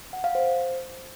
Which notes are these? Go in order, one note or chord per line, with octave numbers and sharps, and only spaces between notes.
F#5
F5
C5